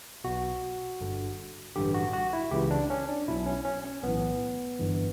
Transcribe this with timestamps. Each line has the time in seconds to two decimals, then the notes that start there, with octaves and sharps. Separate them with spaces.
0.24 B1 B2 F#4
1.01 G1 G2 D3
1.76 A1 G2 D3 G4
1.94 F#4
2.13 F#4
2.33 E4
2.51 C#2 C#3 E3 G4
2.71 D4
2.90 C#4
3.09 D4
3.28 B1 B2 E4
3.46 C#4
3.65 C#4
3.84 C#4
4.03 B1 A2 E3 B3
4.79 G1 G2 E3